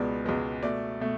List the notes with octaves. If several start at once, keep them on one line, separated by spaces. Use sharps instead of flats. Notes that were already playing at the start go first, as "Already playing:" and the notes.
Already playing: C#2 B2 G#3 B3 D5
C#2 B2 G#3 B3
B2 A3 D5
B2 A3